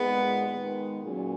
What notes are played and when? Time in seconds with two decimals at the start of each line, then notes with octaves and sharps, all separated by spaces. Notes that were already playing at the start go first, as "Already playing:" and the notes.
Already playing: A#2 G#3 B3 D#4 G#4
0.47 D#3 G#3 B3 D#4 G#4
1.03 A#2 F#3 C#4